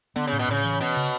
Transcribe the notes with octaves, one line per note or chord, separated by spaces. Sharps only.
D3 B3
C#3
A2
B2
A2 C#3
E3
B2 C#4
C#3